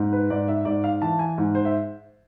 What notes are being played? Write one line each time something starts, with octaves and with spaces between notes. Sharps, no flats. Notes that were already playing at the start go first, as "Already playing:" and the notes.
Already playing: G#2
B4
G#2 D5
E5
G#2 D5
F5
E3 A5
G#5
G#2
C5
E5